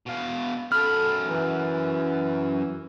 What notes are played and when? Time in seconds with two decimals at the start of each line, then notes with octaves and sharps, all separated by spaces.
0.06 B2 F5
0.72 F#2 A4 B5 F6
1.23 E3